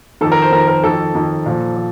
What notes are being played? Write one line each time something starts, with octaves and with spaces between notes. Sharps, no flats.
F2 D#3 A4
A#4
C5
F2 D#3 A#4
A#4
F2 D#3 A4
F2 D#3
A#2 F3
F3